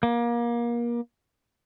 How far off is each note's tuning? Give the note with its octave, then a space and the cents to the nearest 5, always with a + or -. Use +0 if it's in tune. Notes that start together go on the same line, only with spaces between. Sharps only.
A#3 +30